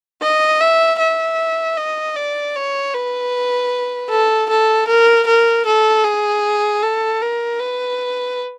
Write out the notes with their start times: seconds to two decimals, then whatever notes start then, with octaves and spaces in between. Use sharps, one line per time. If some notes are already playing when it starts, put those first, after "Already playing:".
0.22 D#5
0.61 E5
0.99 E5
1.77 D#5
2.16 D5
2.55 C#5
2.94 B4
4.10 A4
4.50 A4
4.88 A#4
5.27 A#4
5.66 A4
6.04 G#4
6.83 A4
7.22 A#4
7.60 B4